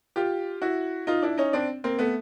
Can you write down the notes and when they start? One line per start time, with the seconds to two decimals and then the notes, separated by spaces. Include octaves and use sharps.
0.16 F4 G4
0.62 E4 F#4
1.07 D#4 F4
1.22 D4 E4
1.38 C#4 D#4
1.53 C4 D4
1.84 A#3 C4
1.99 A3 B3